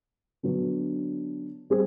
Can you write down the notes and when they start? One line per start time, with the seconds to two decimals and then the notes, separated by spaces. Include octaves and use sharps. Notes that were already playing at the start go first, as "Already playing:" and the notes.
0.43 D3 F#3 B3 D4
1.70 G3 C4 G#4